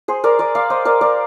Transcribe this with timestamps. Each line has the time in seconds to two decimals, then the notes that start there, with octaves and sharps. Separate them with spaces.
0.08 G#4 C5
0.24 A#4 D5
0.39 A#4 D5
0.55 D5 F5
0.70 C5 D#5
0.85 A#4 D5
1.01 A#4 D5